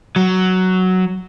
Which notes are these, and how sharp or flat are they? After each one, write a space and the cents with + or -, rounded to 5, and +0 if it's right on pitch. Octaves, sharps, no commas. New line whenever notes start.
F#3 +5